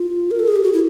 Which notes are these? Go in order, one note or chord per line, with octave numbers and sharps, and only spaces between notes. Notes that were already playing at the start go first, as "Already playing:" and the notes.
Already playing: F4
A#4
A4
G#4
G4
F#4
E4